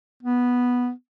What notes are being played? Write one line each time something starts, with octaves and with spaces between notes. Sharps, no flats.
B3